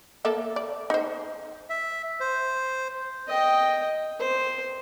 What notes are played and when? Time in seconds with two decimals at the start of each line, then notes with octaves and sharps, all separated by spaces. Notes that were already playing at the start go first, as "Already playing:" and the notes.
0.25 A#3 A4 E5
0.56 D5
0.90 D#4 C5
1.70 E5
2.20 C5
3.28 D#5 G5
4.19 C5